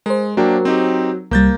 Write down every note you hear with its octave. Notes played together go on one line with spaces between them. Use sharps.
G#3 A#4 C5
F#3 A#3 D4 G5
C4 D#4 G4
C2 G3 A#3 G6 A6